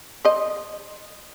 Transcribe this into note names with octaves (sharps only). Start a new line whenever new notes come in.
C5 D#5